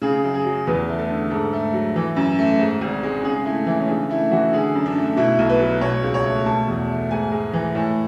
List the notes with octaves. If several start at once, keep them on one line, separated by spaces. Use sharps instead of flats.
C#3 G#4
F#2
G#4
F#3
E2 B4
A3
A4
D3
G#2 A4
A3
F#3
E3
F#2
A3
G#2
G#1
G#3
C#3 G#4
A3 E4
E3 E4
C#4
C#3 D4
A3 E4
E3 F#4
D3 G#4
F#2
D4
A3
B2 E4
B1
B4
F#3
B2 C#5
C#2
C#5
A3
B2 A5
E2
A3
G#2 G#5
G#3
E3
A2